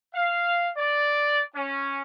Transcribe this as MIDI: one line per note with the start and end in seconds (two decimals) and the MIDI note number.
0.13 0.69 77
0.77 1.40 74
1.55 2.02 61